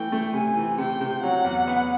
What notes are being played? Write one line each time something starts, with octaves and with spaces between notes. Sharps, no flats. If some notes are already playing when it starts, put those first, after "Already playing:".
Already playing: E3 A3 G5
A3
C3 G#5
E3
C3 G5
C3
F#3 F#5
E2
B3